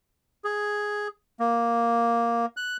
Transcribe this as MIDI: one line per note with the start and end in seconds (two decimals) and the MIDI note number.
0.44 1.08 68
1.40 2.46 58
2.57 2.77 90